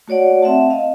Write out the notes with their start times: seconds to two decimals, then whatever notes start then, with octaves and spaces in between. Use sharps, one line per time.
0.08 A3 F#4 C#5 D5 F#5
0.42 C4 E5 F#5 A5
0.70 D#5 F5